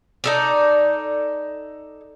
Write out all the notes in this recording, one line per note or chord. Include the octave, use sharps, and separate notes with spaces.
D#4 A4 D5